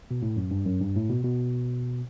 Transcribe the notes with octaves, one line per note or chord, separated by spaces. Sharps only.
B2
A2
F#2
G2
F#2
G2
A2
B2
B2